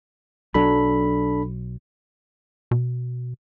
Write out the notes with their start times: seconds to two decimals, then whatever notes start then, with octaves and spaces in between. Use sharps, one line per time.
0.54 B1 F#3 D4 A4 B5
2.71 B2